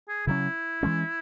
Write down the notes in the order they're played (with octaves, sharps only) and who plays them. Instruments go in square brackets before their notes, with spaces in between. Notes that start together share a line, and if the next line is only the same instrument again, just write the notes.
[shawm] G#4
[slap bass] C#3 F#3 C#4 [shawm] E4
[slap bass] E3 G#3 C#4